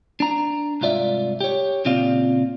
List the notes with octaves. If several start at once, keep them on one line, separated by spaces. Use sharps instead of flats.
D4 A#5
C2 G#2 F4 D5 E5
G4 C#5
A#2 C#3 C4 F4 D5 F5